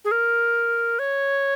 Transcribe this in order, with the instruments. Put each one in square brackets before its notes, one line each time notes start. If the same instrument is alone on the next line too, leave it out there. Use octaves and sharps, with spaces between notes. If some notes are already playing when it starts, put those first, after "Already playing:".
[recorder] G#4
A#4
C#5